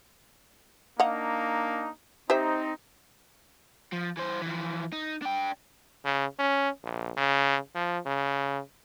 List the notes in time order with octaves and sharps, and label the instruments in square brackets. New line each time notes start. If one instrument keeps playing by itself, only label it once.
[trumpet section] A#3 D4 D#4 [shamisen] D#5 F5 F#5
[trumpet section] C4 D#4 [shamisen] G4 C5 E5
[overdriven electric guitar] F3
E3 C5
E3 F3
D#4
D4 G5
[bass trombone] C#3
C#4
A#1
C#3
F3
C#3